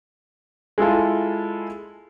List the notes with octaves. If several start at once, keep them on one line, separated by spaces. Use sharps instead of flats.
G#3 E4 F4 A4